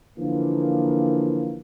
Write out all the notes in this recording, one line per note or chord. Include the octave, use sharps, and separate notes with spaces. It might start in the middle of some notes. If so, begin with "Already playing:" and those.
D3 E3 F3 A#3